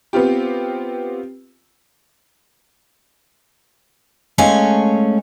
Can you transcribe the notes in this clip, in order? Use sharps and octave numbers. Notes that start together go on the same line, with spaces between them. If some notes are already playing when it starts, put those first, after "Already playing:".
B3 C4 F4 G4
G#3 A3 C#4 F5 G#5